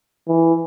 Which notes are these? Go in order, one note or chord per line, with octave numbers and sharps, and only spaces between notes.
E3